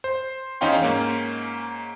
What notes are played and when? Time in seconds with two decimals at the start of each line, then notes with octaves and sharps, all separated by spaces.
0.04 C5
0.61 E2 C#4 D#4 F5 G5 C6
0.82 G#2 A#3 C#4